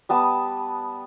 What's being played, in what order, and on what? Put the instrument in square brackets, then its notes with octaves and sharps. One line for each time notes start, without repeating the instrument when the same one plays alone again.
[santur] G3 B3 A5 D#6